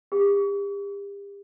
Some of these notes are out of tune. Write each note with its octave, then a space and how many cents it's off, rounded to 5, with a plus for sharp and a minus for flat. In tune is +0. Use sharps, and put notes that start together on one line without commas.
G4 +40